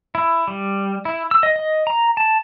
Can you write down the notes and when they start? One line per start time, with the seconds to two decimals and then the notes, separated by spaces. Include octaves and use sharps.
0.15 E4
0.48 G3
1.05 E4
1.31 E6
1.43 D#5
1.56 D#5
1.87 A#5
2.17 A5